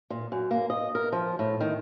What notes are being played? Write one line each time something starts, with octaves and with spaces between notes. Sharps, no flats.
A#2
F#2
A#3
D#5
A#4
F3
A2
D#3